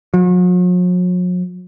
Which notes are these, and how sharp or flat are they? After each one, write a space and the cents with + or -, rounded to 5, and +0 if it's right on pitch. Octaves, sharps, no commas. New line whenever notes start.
F#3 -45